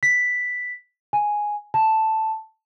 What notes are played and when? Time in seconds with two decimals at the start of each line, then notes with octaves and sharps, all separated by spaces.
0.03 B6
1.13 G#5
1.74 A5